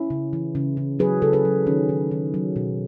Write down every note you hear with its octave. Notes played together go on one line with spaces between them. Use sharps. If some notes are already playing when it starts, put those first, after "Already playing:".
Already playing: C#4 E4
C#3
E3
C#3
C#3
F#3 G#4 B4
C#3 A4
G#4 B4
F#3
D#3 C#4
D#3
D#3
F#3
B2